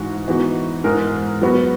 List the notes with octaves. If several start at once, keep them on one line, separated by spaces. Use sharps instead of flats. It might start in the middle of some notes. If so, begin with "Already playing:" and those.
Already playing: G#2 E3 G#3 D#4 F#4
E3 B3 D#4 F#4
G#2 E3 G#3 D#4 A#4
F#3 B3 F#4 B4